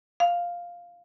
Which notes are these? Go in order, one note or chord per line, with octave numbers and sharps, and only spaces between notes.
F5